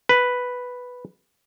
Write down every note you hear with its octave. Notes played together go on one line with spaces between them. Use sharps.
B4